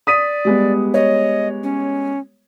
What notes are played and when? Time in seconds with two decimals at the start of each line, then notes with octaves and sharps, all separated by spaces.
0.07 D5 D#6 B6 D#7
0.45 G3 G#3 B3
0.94 C#5 D#5
1.63 C#4